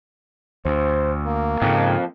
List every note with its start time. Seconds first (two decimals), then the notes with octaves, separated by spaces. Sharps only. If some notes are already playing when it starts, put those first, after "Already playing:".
0.65 D2 C5
1.27 A#3
1.62 F2 G#2 C#3